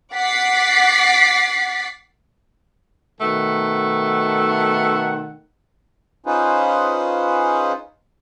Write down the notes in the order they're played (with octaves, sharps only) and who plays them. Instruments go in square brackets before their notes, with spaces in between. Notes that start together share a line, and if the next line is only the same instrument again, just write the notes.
[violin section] F#5 D6 A6 B6 C7
[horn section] B2 D#3 A3 A4 F#5
[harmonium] C#4 D#4 F4 G#4 B4 C5